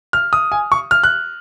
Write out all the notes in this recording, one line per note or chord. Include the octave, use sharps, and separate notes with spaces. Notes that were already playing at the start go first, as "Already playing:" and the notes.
F6
D#6
G#5
C#6
F6
F#6